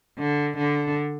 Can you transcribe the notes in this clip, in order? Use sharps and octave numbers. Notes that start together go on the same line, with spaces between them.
D3
D3